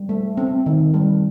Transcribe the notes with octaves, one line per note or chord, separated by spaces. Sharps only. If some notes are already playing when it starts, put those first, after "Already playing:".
Already playing: G3
A3
C4
D#3
G3